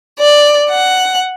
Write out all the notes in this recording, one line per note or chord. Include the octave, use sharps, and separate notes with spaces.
D5
F#5